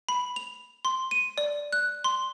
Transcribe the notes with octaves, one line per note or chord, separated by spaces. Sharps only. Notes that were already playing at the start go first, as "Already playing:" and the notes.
B5
F7
C6
D#7
D5
F#6
C6